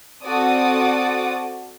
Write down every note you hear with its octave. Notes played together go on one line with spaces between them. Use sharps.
C4 F#4 A4 D5 D#6